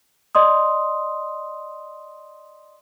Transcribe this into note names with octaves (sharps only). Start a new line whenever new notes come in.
D5 D#5 C6 D#6